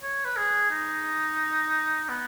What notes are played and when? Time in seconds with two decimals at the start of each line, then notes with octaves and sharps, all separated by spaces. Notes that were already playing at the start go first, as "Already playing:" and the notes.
0.02 C#5
0.25 B4
0.37 G#4
0.70 D#4
2.09 B3